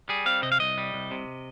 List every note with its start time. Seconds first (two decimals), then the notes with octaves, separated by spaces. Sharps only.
0.09 G3 G#4
0.26 C4 F5
0.42 C3 D#5
0.52 F5
0.60 C2 D#5
0.78 G3
0.94 C2
1.11 C3